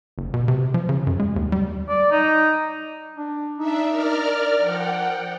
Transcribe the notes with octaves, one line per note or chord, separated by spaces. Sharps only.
F#1
B2
C3
F3
C#3
F#2
G#3
D#2
G3
D5
D#4
D4
D4 D#4 E5
A#4 D5 F6
F3 F#5 G5